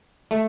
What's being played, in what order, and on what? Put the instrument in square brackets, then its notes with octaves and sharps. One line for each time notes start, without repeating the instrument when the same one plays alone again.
[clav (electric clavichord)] A3